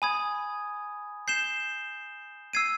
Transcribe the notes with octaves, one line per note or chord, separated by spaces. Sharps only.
G#5 B5 D#6 G#6
G6 C7 E7 G7
E6 G#6 C7 D#7